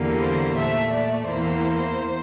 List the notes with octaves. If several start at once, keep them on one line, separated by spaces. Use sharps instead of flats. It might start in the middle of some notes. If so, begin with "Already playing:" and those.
Already playing: E2 D3 G3 A#3
C5
A#2 A3 E5
D5
E2 E3 A#3 C5